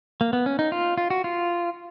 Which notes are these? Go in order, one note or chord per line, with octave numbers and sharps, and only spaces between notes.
A#3
B3
C#4
D#4
F4
F4
F#4
F4